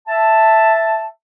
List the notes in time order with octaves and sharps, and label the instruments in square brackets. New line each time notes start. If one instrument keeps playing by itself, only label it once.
[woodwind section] E5 A5